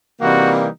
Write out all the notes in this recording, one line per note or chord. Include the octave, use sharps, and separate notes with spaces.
C3 E3 G3 A#3 D#4 F#4